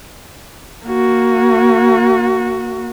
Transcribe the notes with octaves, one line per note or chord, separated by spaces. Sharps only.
A#3 F#4